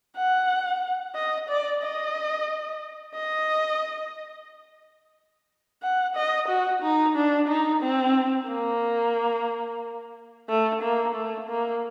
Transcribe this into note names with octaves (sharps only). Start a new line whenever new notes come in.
F#5
D#5
D5
D#5
D#5
F#5
D#5
F#4
D#4
D4
D#4
C4
A#3
A3
A#3
A3
A#3